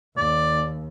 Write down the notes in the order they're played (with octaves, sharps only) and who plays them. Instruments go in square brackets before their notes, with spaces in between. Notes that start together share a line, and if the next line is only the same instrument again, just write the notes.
[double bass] D#2 [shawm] D5